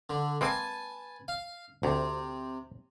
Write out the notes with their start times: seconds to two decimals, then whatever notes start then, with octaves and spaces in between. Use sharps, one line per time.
0.10 D3
0.41 G#3 A#3 C4 B4 G#5 A5
1.28 F5
1.83 D2 C3